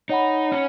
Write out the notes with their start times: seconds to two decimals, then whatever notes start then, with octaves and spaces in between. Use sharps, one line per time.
0.09 D#4 C#5 F#5 B5
0.52 C#4